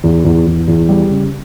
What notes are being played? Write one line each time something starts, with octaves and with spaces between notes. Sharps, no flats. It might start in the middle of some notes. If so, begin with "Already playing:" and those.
E2
E2
E2
E2
G3
C#3